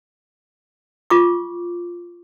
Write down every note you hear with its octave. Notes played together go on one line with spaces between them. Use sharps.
F4 C#6 D6